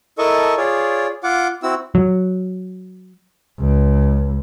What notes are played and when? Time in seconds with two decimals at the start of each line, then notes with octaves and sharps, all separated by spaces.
0.18 E4 A4 A#4 D#5 A5 C#6
0.57 F4 G#4 C#5 D5
1.24 F4 F#5 D6
1.63 C4 E4 F#4 E6
1.95 F#3
3.60 C#2